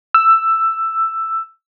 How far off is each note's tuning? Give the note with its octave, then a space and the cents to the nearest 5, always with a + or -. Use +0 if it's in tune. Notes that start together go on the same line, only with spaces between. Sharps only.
E6 +10